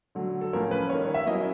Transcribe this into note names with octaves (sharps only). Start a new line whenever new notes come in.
D3 F#3 A3
A4
A2 F3 A#3 C#4 A#4
B4
D#3 G3 A#3 C#5
E5
F#3 A#3 C#4 E4 D#5